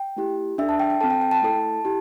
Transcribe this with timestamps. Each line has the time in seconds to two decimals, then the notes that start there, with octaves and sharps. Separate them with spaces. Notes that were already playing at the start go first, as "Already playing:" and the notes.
Already playing: G5
0.16 A3 E4 G4
0.58 D4 E5
0.61 A4
0.69 A5
0.80 G5
0.90 G5
1.01 C4 A4 A5
1.10 G5
1.21 G5
1.31 A5
1.42 A3 E4 A4
1.85 E4 G4